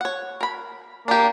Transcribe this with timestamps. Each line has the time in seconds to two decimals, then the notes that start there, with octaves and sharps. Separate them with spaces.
0.01 C#5 F#5
0.41 A#4 B5
1.08 A#3 D4 G4